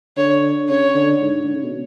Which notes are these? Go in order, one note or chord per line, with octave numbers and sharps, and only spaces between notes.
D3 C#5
C#3 C#5
D3
G#2
D3
C#3
B2